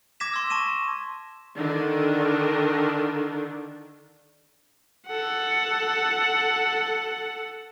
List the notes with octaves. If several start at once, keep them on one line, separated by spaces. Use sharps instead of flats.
D6 G#6 A#6 B6 E7
C6 E6
A5 C#6 D#7 E7
D3 D#3 D4
A4 F#5